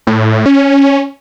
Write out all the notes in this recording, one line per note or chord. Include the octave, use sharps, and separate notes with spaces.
A2
C#4